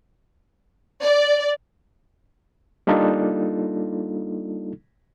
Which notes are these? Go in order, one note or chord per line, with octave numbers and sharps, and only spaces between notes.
D5
G3 A#3 D4 D#4 F4 A4